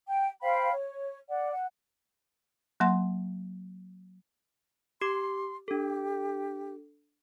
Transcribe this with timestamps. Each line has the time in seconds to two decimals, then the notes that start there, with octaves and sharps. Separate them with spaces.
0.07 G5
0.42 C5 F5 G5 B5
0.71 C#5
1.29 D5 F#5
1.52 F#5
2.80 F#3 A#3 F#5 C6
5.01 G4 C6 D6
5.68 D4 G4 A4